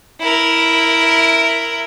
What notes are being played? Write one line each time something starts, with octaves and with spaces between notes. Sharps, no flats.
E4 A#4